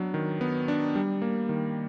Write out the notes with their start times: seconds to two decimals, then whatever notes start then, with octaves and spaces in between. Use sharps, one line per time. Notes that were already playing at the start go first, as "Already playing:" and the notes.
Already playing: F#3 B3 D4
0.14 D#3
0.41 B3
0.68 D4
0.95 G3
1.22 A#3
1.49 D#3